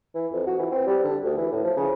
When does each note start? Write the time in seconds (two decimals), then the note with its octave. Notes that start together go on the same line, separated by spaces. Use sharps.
0.15 E3
0.33 F2
0.46 F#4
0.59 E3
0.71 C4
0.87 G3
1.04 D3
1.24 D2
1.38 E3
1.52 A2
1.64 F3
1.77 C#3